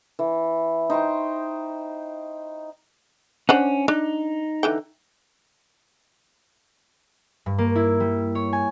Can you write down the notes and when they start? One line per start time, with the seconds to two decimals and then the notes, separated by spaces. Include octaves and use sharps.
0.19 E3
0.90 D#4 C5 G5 C#6
3.49 C#4 D4 C5 F#5
3.88 D4 D#4
4.63 D3 E3 G5
7.46 G2
7.58 A#3
7.75 E4
8.00 G3
8.35 C#5
8.53 G#5